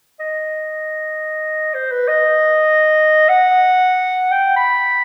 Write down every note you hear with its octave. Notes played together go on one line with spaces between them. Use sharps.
D#5
C5
B4
D#5
F#5
G5
B5